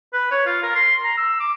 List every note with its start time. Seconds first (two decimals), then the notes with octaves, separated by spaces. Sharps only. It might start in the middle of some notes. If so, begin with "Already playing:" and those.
0.13 B4
0.31 C#5
0.46 F4
0.63 A#4
0.75 C6
1.04 A#5
1.17 E6
1.40 D6